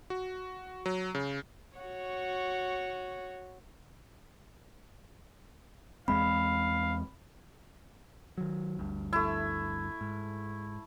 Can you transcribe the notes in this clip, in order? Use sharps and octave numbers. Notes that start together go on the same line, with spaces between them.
F#4
F#3
C#3
F#4 C#5
E2 G#3 C4 F5 B5
D#3 F#3
G1 D2 G2
A3 E4
G#2